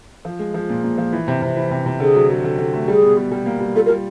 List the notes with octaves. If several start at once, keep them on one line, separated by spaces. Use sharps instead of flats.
F3
G#3
F3
A#2
A#2
F3
E3
C3
C3
E3
C3
C3
D3 G#4
F#3
F#3
D3
D3
A3
G3 G#4
B2
B2
G3
A#3
G3
F4 A4
A#4
G3